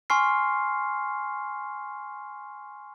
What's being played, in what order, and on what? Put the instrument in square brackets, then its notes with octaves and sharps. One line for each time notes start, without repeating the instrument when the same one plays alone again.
[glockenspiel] G#5 C6 C#6 F6 C7